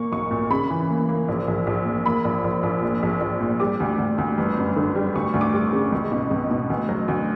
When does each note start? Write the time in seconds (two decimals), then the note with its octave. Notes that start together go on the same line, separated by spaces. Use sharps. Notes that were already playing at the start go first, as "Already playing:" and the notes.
Already playing: A#2 A#3 C#6
0.12 B1 C#6
0.31 A#2
0.50 C#3 B5
0.70 E3
0.90 A#3
1.09 A#3
1.28 A#1
1.48 A#1
1.67 A#1
1.86 A#2
2.06 A#3 B5
2.25 A#1
2.44 A#1
2.63 A#1
2.82 A#2
3.03 A#1
3.21 A#1
3.41 A#2
3.60 G3 D6
3.80 D2
3.98 D2
4.18 D2
4.38 G1
4.57 F#2
4.76 D3
4.96 G3
5.16 D2 C#6
5.34 D2
5.41 D6
5.54 G3
5.67 C#6
5.73 C#3
5.92 C#2
6.12 B2
6.31 C#2
6.51 B2
6.70 D2
6.89 F#3
7.08 D2